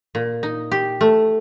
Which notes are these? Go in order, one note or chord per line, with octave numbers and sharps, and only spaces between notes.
A#2
D#4
G4
A3